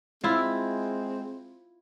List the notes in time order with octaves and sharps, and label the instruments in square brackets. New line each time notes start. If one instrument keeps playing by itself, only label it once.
[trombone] G#3 [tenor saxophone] C4 [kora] E4 F4